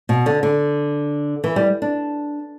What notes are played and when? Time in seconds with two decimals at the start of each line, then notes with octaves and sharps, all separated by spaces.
0.09 B2
0.26 D3
0.43 D3
1.44 E3
1.56 G3
1.82 D4